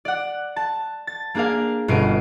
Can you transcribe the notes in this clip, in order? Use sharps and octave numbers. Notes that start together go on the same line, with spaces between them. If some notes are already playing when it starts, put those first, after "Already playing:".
D5 F#5
A5
A6
A#3 D4 G#4 A#4 F5
G1 B2 C#4 C7 D7 D#7